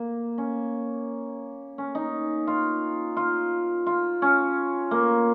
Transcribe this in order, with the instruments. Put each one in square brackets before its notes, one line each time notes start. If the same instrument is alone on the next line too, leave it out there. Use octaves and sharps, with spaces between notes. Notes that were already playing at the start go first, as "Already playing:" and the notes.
Already playing: [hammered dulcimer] A#3
C#4
C#4
D#4
F4
F4
F4
C#4
A#3